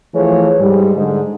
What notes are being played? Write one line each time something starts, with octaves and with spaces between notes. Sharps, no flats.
E3 F3 A3 G#4 C#5
G#2 G3
G#2 D3 G#3